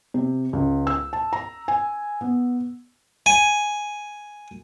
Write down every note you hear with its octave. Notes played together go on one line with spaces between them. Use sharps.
C3
C#2
E6
A5
A#5
G#5
B3
G#5